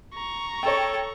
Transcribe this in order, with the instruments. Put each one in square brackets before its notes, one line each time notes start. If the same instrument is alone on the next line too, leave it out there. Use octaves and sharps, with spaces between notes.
[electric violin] A#5 C#6
[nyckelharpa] A4 [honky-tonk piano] C#5 G5